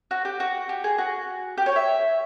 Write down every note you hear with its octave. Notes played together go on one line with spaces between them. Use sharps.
F#4
G4
F#4
G4
G#4
F#4
G4
C#5
E5